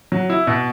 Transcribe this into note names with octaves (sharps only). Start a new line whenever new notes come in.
F#3
E4
B2